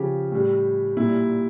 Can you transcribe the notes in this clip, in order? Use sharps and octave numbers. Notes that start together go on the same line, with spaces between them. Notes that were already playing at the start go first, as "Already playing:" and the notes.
Already playing: C#3 F3 G4
A2 G3
A#2 G3 E4